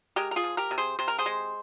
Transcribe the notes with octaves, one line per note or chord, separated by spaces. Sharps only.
G#3 G4 A#4
A#4
F4 G#4
F3
G4 A#4
C3
G#4 C5
C3 C5
A#4
G#4 C5
G#3